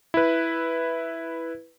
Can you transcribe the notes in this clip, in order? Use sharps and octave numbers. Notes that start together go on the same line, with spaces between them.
E4 B4